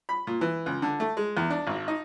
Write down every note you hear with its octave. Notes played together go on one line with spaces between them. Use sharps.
B5
A#2
E3
C#2
D3
A3
G#3
E2
D4
G#1
D#4